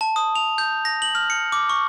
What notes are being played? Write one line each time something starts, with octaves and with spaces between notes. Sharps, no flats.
A5
D#6
F7
G6
A#6
F#7
F6
C#7
D6
C#6